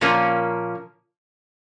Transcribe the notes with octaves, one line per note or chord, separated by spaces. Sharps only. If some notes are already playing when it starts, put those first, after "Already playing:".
A#2 F3 A#3 C#4